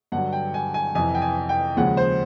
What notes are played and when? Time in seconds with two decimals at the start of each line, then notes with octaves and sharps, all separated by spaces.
0.12 G2 D3 F#3 F#5
0.32 G5
0.54 G#5
0.74 G#5
0.95 F2 C3 E3 G#5
1.15 G5
1.22 G#5
1.49 G5
1.77 D#2 C#3 F3 G#3 F#5
1.97 C5